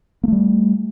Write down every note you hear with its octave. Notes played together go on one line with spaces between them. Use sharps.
G3 A3 A#3